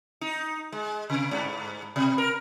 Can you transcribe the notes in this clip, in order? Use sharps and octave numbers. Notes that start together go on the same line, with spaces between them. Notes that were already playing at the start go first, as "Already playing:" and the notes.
D#4
G#3
C3
G2
B2
A#4